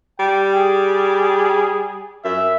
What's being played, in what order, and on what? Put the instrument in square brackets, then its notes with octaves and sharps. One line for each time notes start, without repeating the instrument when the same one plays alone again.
[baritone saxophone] G3 [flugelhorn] G5
[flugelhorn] G#4
[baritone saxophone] F#2 [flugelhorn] E5